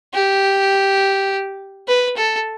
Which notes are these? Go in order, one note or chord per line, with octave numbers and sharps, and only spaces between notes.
G4
B4
A4